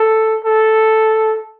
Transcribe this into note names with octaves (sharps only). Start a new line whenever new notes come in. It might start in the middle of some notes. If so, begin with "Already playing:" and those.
Already playing: A4
A4